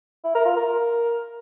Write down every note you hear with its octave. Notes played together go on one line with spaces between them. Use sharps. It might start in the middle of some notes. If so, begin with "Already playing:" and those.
E4
A#4
F4
A#4